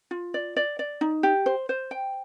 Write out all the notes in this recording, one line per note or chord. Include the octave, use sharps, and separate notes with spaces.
F4
D5
D5
D5
D#4
G4
C5
C5
G5